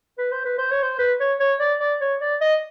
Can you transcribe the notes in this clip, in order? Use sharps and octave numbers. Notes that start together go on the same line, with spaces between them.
B4
C5
B4
C5
C#5
C5
B4
C#5
C#5
D5
D5
C#5
D5
D#5